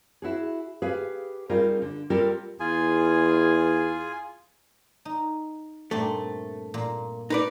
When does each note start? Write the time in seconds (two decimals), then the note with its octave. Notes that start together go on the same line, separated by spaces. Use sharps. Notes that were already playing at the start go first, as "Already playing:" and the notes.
0.22 E4 F#4 G#4
0.82 G4 G#4 B4 F5
1.49 G3 C4 D#4 F4 G#4 A#4
1.82 D3
2.10 G3 C4 F4 G4 A4 A#4
2.60 E2 F4 G#4 G#5
5.05 D#4
5.91 G2 A#2 A3 C4
6.74 A#2 A#3
7.30 D#4 B4 D5